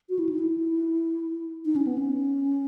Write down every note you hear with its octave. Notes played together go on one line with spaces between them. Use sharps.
F#4
E4
D#4
E4
D#4
C#4
B3
C#4